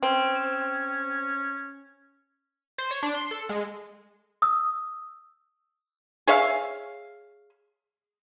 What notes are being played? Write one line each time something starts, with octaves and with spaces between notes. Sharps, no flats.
C4 C#4
C5
C#5
D4
C6
A4
G#3
D#6 E6
G#4 C#5 E5 F5